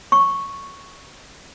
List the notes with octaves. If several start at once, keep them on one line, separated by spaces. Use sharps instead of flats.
C#6